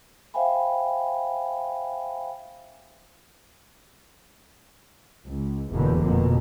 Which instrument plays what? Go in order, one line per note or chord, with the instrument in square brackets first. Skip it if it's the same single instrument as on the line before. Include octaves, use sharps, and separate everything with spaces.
[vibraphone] C5 E5 F5 G5 G#5 B5
[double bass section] C#2
F1 E2 B2 D3 A#3
F2 B2 A#3